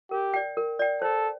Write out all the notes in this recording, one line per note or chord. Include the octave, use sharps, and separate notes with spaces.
G4 A#4
D5 G5
A#4
D5 G5
A4 C5